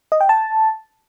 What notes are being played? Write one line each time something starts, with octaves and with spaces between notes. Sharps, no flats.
D#5
G5
A5